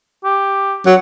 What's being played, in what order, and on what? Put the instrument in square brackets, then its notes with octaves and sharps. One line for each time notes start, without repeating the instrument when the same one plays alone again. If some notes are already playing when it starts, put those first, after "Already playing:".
[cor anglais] G4
[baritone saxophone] F#3 [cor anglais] F#5